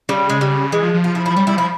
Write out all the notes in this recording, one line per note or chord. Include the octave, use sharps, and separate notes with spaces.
C#3 G3
G#3
G3
E3 G#3
F3
F3
F4
E4
E4
F3
G3 C#4
G3 E4
F3 E4